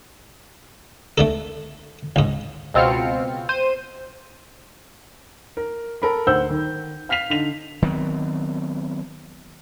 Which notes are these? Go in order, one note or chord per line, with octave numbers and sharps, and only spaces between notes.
A3 D4 A4
C#2 G#2
C#2 B2 C4 F4 F6 C#7
C5 D#7
A#4
A4 A#4 B5
D2 C5 F#5 E6 G6
D#3
F5 F6 B6 C7 F7
D3 D#4 F7
D#3 F#3 B3 C4